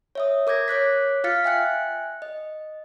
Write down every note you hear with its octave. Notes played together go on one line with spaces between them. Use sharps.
C#5 E5 D#6
A#4 D6 G6 G#6 A#6
C#5 D6 F#6 B6
F4 F5 F6 A6 B6 C#7
E5 G5 G#5 F#6 C#7
D#5